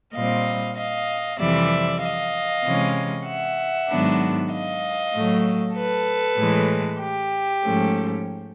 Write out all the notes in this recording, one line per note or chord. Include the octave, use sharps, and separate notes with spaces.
A#2 G3 C4 D#5 F5
D#5 F5
F2 C3 E3 G3 D5 E5
D#5 F5
C3 E3 G#3 C#4
E5 F#5
G#2 D#3 F#3 B3 D4
D#5 F5
A2 F#3 A3
A4 B4
A2 E3 G#3
G4
G#2 F3 A3 C#4